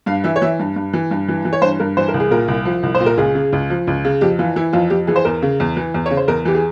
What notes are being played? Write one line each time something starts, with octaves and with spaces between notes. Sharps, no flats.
G2 F5
E3 E5
C#5
E3 E5
G2
G2
E3
G2
E3
E3
C#5
G2 C5
G2 A#4
E3 C5
A#4
C2
G#4
A#2 A#4
C2
F3
C2
C5
A#2
A#4
C#2 G#4
C#3
C#2
F3
C#2
C#3
F2 G4
E3 F4
E3 E4
F2 F4
F2 G4
E3 G#4
C5
E2 A#4
C#3
E2
E3
E2
C#3 C#5
C5
E2 A#4
E3 G4
G#4